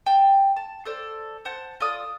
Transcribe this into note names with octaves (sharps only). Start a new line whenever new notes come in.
G5 A5
A5
A4 C5 D5
C5 F#5 A5
F4 A4 D5 D#6